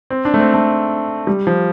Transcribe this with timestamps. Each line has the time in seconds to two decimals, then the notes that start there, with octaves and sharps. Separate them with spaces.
0.10 C4
0.25 D4
0.34 A3
0.40 C4
0.54 A3
1.27 G3
1.47 F3